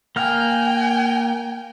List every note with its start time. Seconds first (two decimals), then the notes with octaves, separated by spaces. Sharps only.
0.16 A#3 G5 G#5 F6